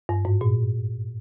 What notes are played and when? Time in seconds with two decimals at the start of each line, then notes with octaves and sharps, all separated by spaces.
0.09 G2
0.25 G#2
0.41 A#2